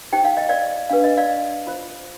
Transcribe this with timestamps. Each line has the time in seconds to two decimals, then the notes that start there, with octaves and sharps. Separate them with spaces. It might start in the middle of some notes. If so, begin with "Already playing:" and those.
0.12 D#4 G4 C5 G5
0.25 F5
0.37 D#5
0.49 D5 F5
0.90 D4 G4 B4 F5
1.04 D#5
1.17 D5 F5
1.67 F4 C5